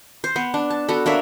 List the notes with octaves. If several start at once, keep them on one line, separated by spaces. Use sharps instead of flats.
C5
B3
D4
A5
B3 F#4 A4
A#3 D4 C#5 E5